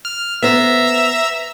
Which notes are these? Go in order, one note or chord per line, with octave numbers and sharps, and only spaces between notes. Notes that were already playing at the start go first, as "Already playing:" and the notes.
F6
B3 C5 E5 A#5 E6